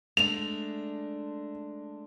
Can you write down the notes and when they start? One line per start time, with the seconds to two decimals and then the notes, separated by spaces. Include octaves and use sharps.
0.17 G#3 A3 D4 F7